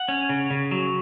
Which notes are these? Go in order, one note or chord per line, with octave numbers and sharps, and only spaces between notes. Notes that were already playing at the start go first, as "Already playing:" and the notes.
Already playing: F#5
C#4
C#3
C#3
F#3